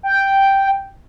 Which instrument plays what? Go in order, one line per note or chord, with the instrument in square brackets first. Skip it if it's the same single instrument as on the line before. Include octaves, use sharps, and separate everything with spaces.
[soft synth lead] G5